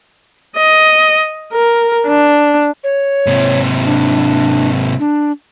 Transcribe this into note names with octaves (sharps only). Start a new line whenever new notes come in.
D#5
A#4
D4
C#5
G#2 C3
D4
D4